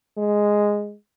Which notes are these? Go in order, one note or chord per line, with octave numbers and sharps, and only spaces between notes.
G#3